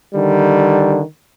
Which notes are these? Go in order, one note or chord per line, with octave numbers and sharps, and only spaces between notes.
D3 D#3 G3